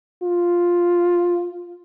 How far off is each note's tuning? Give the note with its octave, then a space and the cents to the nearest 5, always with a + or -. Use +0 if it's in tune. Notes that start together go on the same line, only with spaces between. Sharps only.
F4 +5